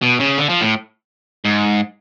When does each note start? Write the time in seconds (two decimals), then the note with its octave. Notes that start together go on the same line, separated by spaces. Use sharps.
0.02 B2
0.20 C#3
0.38 D3
0.49 F3
0.61 A2
1.45 G#2